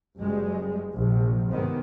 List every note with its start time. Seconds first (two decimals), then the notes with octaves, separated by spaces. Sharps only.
0.18 F#1 G3 G#3
0.93 A#1 C3
1.49 G#2 C3 D#3 B3 C4